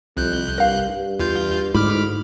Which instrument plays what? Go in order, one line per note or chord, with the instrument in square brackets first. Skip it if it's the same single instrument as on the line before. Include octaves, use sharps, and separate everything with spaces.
[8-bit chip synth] C2 F#6 G6 [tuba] F2
[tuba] G2 [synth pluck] A#4 F5
[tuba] G2
[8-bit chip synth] E2 F4 G6
[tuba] D2 [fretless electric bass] G#2 [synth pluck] E4 [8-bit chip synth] B5 D6 F6